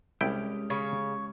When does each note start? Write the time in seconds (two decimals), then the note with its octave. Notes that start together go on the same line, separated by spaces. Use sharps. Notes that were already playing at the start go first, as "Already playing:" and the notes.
0.21 C2 G#3 C#4 E4 G4 G5
0.70 C#3 C#5